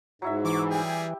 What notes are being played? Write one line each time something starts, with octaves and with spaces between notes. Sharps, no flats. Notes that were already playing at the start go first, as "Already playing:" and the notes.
G#2 F#3 E4 E5
E3 C#6 D6
G3 G4 G#4